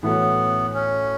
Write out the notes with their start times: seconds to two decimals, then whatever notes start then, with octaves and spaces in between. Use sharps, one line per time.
0.03 A2 E3 A3 B3 C#4 F#4
0.74 C#4